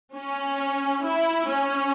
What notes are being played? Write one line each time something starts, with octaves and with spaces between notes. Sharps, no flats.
C#4
E4
C#4